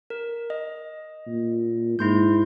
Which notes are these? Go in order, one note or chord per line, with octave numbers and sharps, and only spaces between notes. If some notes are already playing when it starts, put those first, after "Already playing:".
A#4
D#5
A#2
G#2 E4 C6 G6